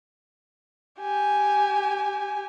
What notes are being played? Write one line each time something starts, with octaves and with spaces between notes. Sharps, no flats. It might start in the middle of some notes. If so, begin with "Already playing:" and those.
G4 G#5